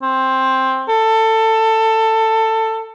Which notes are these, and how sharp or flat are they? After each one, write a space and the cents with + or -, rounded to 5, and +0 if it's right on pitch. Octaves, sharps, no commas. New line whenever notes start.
C4 +10
A4 +20